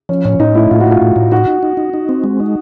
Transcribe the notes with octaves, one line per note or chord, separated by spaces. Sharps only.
F3 C#4
A2 C#4
A2 D#4
A3 E4
A2 F4
F#4
A3
F4
A2
A2
D#4 F#4
D#4
D#4
D#4
D#4
C4
G#3
D#4